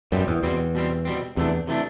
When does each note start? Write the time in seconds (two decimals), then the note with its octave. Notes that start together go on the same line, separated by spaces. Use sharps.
0.12 F#2 B2 G3 C4
0.28 E2
0.43 E2 B2 G3 C4
0.75 B2 G3 C4
1.05 B2 G3 C4
1.36 E2 C3 E3 A3 D4
1.67 C3 E3 A3 D4